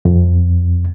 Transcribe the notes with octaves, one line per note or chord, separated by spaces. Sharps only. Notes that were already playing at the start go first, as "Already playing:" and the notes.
F2